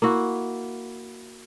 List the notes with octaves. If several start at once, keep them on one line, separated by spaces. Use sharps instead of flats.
A#3 E4 F#4